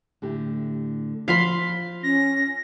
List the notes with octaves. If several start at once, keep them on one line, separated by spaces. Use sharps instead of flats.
A2 D3 G4
F3 F4 C5 F5 B5 C6
C#4 A#6